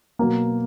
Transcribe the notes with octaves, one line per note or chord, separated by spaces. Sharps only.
B2 F#3 A#3